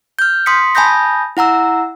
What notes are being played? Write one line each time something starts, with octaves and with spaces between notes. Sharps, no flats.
F6 G6
C6 D#6 B6 C#7
G#5 A5 B5 D#6 G6 A#6
E4 F#5 A#5 E6